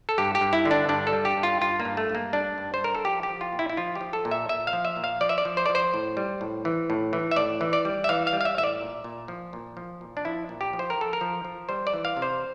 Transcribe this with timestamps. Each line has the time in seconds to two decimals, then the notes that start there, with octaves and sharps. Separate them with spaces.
0.09 A4
0.18 G2 G4
0.35 G4
0.41 G2
0.53 E4
0.65 D3
0.71 D4
0.89 G2 D4
1.07 A4
1.13 G3
1.25 G4
1.38 G2
1.43 F4
1.61 G2 F4
1.80 A#3
1.85 G2
1.97 A3
2.10 G2
2.15 A#3
2.33 G3 D4
2.58 G2
2.74 C5
2.81 G3 A#4
2.95 A4
3.05 F3 G4
3.23 G4
3.29 F3
3.41 F4
3.53 A#2
3.59 E4
3.70 E4
3.77 F3 F4
3.95 G4
4.01 F3
4.13 A4
4.25 A#2
4.31 E5
4.49 A#2 E5
4.67 F5
4.73 F3
4.85 E5
4.97 A#2
5.04 F5
5.21 F3 D5
5.29 E5
5.38 D5
5.45 F3
5.57 C5
5.66 F3 D5
5.75 C5
5.94 A2
6.17 G3
6.41 A2
6.65 E3
6.90 A2
7.13 E3
7.31 E5
7.36 A2 D5
7.61 E3
7.73 D5
7.85 G3
8.04 E5
8.09 E3 F5
8.27 F5
8.33 G3
8.41 F5
8.45 E5
8.57 A2 E5
8.64 D5
8.81 A#2
9.04 A#2
9.28 F3
9.53 A#2
9.77 F3
10.01 A#2
10.17 D4
10.25 F3 E4
10.49 A#2
10.61 G4
10.73 F3
10.79 C5
10.90 A#4
10.97 F3 A4
11.13 A#4
11.21 F3
11.45 F3
11.69 G3 C5
11.87 D5
11.93 E3
12.05 F5
12.17 C3
12.22 C5